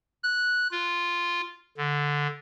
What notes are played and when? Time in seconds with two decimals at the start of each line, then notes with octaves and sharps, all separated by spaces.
0.23 F#6
0.71 F4
1.78 D3